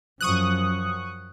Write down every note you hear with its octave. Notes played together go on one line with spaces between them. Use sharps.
F#2 F3 C#6 D#6 F#6